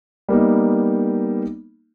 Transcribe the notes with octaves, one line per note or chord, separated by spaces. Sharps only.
G3 A#3 B3 D#4